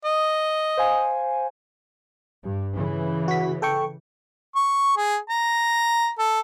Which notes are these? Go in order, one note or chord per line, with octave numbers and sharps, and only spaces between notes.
D#5
C5 F5 G#5
G2
C#3 E3
F#4 B6
A4 G5 C#6
C#6
G#4
A#5
A4